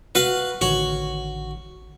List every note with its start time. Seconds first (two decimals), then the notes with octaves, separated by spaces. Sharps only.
0.15 F#4 B4 F5
0.61 A1 D3 D#3 F#4 C#5